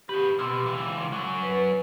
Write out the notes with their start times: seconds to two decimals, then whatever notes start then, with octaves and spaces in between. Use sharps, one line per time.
0.09 D#3 G4 B4
0.39 B2 C6 D6 E6
0.66 C#2 E3
1.12 F#3 C#4
1.42 B4